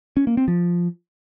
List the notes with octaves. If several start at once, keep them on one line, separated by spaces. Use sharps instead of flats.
C#4
A#3
C4
F3